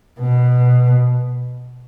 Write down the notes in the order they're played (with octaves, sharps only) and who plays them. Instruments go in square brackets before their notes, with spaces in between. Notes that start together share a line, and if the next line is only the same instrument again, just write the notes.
[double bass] B2